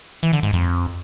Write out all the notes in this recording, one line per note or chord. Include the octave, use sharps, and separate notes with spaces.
E3
D3
G#2
F2